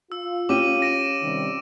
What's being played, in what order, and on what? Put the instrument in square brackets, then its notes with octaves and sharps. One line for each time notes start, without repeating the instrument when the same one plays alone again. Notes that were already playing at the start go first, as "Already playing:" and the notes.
[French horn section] F4 [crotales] E6
[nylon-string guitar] C#4 G4 [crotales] D6 D#7
[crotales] A#6 D7 E7
[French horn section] C3 D#3 G3